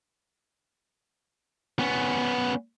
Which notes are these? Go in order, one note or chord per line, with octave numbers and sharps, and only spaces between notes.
B3 C#4